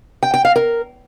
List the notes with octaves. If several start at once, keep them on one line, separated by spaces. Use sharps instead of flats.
G5
G5
F5
A#4